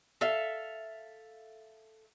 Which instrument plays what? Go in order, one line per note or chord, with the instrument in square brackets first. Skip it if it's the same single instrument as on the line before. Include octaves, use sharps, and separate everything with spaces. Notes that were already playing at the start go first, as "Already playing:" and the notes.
[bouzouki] A4 E5 F5